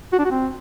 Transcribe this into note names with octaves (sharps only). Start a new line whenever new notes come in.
F#4
D4
F#4
C4